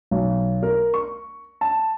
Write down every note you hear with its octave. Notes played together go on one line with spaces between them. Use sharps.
B1
A#4
C#6
A5